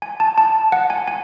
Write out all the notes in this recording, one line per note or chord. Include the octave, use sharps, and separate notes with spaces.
G#5
A5
A5
F#5
G#5
G#5